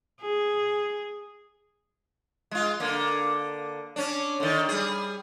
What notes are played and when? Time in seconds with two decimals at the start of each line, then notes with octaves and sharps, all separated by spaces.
0.21 G#4
2.51 G#3 F4
2.80 D3 A#3
3.96 C#4 D4
4.40 D3 D#3
4.69 G3 G#4